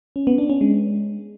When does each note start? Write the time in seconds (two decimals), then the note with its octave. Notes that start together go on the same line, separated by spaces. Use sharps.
0.16 C#4
0.27 B3
0.38 D4
0.50 C#4
0.61 G#3